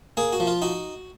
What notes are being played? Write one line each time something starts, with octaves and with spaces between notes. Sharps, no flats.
A#3 G#4
F#4
F3
F4
D#4 F#4